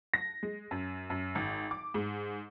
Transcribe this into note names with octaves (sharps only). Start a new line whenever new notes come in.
A#6
G#3
F#2
F#2
G#1
D6
G#2